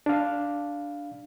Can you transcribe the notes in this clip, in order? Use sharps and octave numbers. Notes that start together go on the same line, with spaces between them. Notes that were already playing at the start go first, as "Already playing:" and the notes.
D4 F5